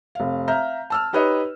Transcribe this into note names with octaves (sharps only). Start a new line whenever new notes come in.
F1 F5
E5 F5 A#5 F6 G6
A5 E6 F6
D#4 G4 B4 C#5 D#5